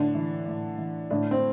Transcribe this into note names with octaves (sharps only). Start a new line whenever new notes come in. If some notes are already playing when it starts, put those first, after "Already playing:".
Already playing: A2 D3 D4
E3
A2
E3
A2 D3 D4
C4